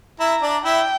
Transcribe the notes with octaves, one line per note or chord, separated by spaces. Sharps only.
E4 E5 A#5
D4 D5
E4 E5 G5